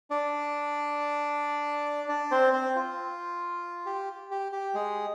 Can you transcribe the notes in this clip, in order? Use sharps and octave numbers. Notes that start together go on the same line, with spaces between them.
D4 D5
D4 D5
C4 C5
C4 C5
F4
G4
G4
G4
G#3 G#4